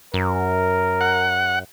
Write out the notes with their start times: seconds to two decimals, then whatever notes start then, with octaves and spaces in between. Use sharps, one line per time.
0.14 F#2 A#4
1.01 F#5